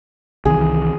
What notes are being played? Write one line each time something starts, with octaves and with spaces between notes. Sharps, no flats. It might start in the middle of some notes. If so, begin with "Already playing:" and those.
C2 D#3 E3 G#4